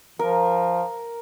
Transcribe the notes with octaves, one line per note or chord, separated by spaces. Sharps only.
F3 A#4